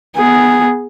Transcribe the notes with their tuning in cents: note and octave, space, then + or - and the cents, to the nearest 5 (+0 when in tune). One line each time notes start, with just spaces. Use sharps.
B3 +0 G#4 +0